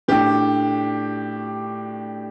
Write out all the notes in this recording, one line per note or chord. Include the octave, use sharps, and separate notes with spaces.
A2 A3 D4 G4